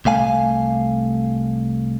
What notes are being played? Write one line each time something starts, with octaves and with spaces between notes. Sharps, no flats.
C2 A3 F5 G#5